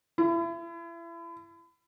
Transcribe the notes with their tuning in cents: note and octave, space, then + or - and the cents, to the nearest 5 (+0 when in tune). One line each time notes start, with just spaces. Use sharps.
E4 +35